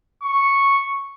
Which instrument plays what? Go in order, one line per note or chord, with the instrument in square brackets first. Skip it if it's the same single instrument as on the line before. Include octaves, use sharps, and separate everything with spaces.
[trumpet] C#6